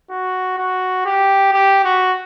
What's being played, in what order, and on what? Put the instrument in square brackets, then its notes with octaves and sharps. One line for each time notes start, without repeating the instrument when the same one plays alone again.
[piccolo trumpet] F#4
F#4
G4
G4
F#4